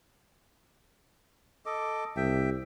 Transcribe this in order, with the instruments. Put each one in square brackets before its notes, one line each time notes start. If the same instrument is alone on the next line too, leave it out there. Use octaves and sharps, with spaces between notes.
[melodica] A4 D#5 D6
[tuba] C2 [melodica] E5 G5